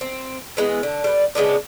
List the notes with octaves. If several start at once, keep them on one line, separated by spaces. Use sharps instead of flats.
C4
E3 G#3 B3
D3
G3 B4
C#3 G#3 B3 D4